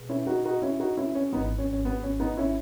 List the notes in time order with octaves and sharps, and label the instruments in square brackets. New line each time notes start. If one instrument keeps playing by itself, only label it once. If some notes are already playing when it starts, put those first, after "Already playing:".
Already playing: [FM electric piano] B2 G#4 B4
[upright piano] C#4 E4
D#4 F#4
D#4 F#4
C#4 E4
D#4 F#4
C#4 E4
C#4
[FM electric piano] G#1 G#2 E3 [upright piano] B3 D#4
[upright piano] C#4
C#4
B3
C#4
B3 D#4
C#4 E4